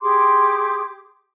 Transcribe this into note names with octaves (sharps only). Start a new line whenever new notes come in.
G4 G#4 C6 D6